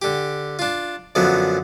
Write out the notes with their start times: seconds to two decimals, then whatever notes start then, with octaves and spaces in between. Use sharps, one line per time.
0.02 D3 G4
0.59 D4 F4
1.15 F#2 D3 F3 F#3 B3